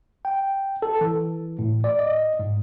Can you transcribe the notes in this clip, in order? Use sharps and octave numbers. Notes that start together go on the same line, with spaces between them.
G5
A4
E3
A2
D5
D#5
G#2